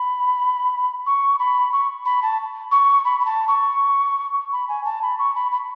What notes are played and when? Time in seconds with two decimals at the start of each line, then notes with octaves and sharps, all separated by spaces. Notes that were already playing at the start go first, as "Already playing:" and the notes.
Already playing: B5
1.06 C#6
1.39 B5
1.73 C#6
2.05 B5
2.22 A5
2.72 C#6
3.05 B5
3.20 B5
3.26 A5
3.48 C#6
4.53 B5
4.69 G#5
4.85 A5
5.02 B5
5.19 C#6
5.35 B5
5.52 B5